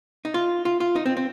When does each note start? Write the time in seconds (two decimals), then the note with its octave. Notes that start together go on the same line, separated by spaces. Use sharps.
0.25 D#4
0.34 F4
0.65 F4
0.80 F4
0.96 D#4
1.06 C4
1.17 C4